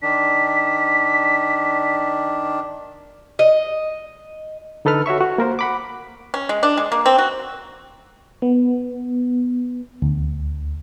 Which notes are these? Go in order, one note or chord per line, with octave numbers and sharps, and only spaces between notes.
D#3 D4 B6
D#5
D3 D#4 A4 B4 F6
F#4 C#5 E5 C#6
F#4
A#3 A#4 C5
F#5 B5 D6
C#4
G#3
D4
G#3
A#3
C4
F#4
B3
D2